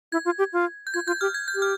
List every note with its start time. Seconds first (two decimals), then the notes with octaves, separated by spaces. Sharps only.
0.12 E4 G#6
0.25 F4
0.38 G4
0.53 F4
0.87 G6
0.94 F4 G#6
1.07 F4 G6
1.21 G4 F6
1.34 G#6
1.48 G6
1.55 G4
1.62 F6